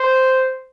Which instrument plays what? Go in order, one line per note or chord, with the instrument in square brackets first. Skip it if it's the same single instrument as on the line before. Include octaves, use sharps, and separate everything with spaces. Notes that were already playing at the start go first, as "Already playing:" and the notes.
Already playing: [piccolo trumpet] C5